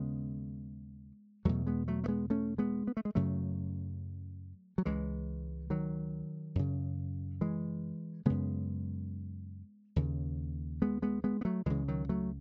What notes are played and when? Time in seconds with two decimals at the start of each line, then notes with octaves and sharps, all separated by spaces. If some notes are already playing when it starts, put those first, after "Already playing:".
Already playing: D#2 C#3 G#3 B3
1.45 E2 B2 F#3 A3
1.67 G#3 B3
1.88 F#3 A3
2.04 A3
2.08 G#3 B3
2.30 A3 C#4
2.58 G#3 B3
2.87 B3
2.97 A3
3.05 G#3
3.15 F#2 C#3 F#3 A3
4.78 F#3
4.85 C#2 C#3 E3 G#3
5.70 D#3 F#3
6.55 F#2 C#3
7.41 E3 G#3
8.25 F#2 C#3 G#3 B3
9.96 D#2 C#3
10.82 G#3 B3
11.02 G#3 B3
11.24 G#3 B3
11.41 B3
11.45 F#3 A3
11.66 C#2 C#3 E3 G#3
11.88 D#3 F#3
12.09 F#3 A3